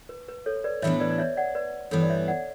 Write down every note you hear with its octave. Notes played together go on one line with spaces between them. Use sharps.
B4
B4
A4 C#5
B4 D5
A2 E3 B3 D4 C#5 E5
B4 D5
D5
C#5 E5
D5 F#5
B4 D5
G2 E3 B3 A4 C#5
D5
C#5 E5
D5 F#5